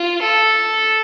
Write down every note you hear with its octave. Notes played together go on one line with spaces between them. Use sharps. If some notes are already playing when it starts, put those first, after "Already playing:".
Already playing: F4
A4